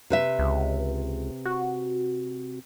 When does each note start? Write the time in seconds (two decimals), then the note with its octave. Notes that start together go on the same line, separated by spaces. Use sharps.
0.10 C3 B4 E5
0.39 C#2
1.45 F#4